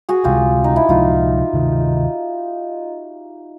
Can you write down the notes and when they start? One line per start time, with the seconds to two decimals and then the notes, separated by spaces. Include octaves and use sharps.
0.09 F#4 G#4
0.24 C#2 C3 F3 G#3 F4 G4
0.64 D#4
0.76 E4
0.89 C#2 C3 F3 G#3 D#4 F4
1.53 D2 C3 D#3